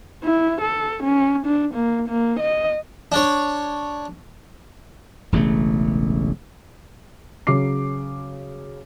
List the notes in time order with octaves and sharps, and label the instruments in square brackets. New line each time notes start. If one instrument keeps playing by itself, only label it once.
[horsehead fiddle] E4
A4
C#4
D4
A#3
A#3
D#5
[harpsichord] D4 C#5
[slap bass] E1 A1 C#3 A3
[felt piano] C#3 F#3 D6 C7